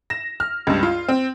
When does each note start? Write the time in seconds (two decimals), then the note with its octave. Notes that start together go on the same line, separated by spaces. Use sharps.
0.10 A#6 E7
0.40 F6
0.67 C#2 G2
0.83 F4
1.09 C4